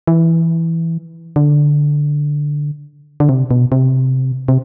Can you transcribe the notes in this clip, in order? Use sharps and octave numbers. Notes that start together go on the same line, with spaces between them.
E3
D3
D3
C3
B2
C3
C3